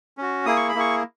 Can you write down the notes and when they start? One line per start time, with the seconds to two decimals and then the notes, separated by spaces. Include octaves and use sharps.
0.18 C#4 F#4
0.46 A#3 E4 G#4 D#6
0.56 C#6
0.69 B5
0.75 A#3 E4 G#4 C#6